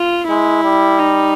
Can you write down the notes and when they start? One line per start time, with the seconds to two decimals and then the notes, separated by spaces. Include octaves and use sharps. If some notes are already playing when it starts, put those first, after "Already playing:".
Already playing: F4
0.29 G#3 E4
0.64 G3
0.99 D#4